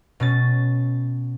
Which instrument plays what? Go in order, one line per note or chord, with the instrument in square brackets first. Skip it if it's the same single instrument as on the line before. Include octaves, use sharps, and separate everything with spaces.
[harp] B2 C#4 A6